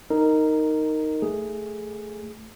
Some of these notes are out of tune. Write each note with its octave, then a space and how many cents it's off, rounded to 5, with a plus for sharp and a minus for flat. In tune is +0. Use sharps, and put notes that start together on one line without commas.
D#4 +0 A#4 -15
A3 +0 G#4 +0